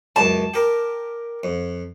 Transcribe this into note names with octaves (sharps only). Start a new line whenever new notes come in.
C#2 F#2 A5
G4 A#4
F2